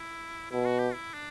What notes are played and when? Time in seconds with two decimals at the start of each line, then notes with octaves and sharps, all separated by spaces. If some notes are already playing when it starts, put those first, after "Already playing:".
Already playing: E4
0.51 B2 E4
0.65 F#4
0.79 G4
0.93 E4
1.14 D4